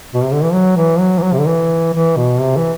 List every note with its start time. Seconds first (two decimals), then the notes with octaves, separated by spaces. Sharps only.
0.14 B2
0.23 C3
0.33 D3
0.43 E3
0.54 F#3
0.77 E3
1.00 F#3
1.19 E3
1.23 F#3
1.33 C3
1.40 D3
1.47 E3
1.93 E3
2.17 B2
2.40 C3
2.57 E3